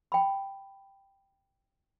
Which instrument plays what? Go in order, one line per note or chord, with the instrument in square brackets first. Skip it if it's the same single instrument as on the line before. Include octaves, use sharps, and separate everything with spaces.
[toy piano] G5 B5